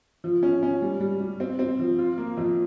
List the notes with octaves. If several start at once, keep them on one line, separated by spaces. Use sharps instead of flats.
F3
C#4
C#4
G3
G3
G3
C4
C4
F3
F4
A#3
F2